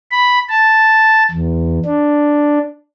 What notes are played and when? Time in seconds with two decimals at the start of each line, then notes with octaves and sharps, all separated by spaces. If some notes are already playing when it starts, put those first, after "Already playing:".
0.11 B5
0.49 A5
1.31 E2
1.85 D4